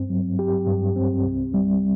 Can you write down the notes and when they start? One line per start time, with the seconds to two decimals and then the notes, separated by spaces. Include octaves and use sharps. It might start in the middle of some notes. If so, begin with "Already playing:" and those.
Already playing: G2 C4
0.10 F#3
0.39 G4
0.67 G2
0.96 C4
1.25 C2
1.54 G3